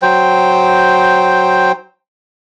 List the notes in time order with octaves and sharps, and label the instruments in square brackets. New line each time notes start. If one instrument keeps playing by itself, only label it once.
[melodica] F#3 C5 G5